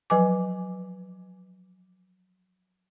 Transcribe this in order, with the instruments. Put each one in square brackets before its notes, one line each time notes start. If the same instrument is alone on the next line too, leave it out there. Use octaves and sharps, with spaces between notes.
[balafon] F3 F#3 B4 G#5 D6